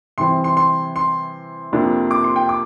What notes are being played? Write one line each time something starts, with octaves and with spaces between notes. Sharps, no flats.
C3 E3 G3 C4 C6
C6
C6
C6
F2 C3 F3 A#3 D4
D6
C6
G5
D6